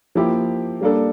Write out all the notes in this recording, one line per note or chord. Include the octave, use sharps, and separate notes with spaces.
F3 A#3 E4 G4
G3 A#3 D4 A4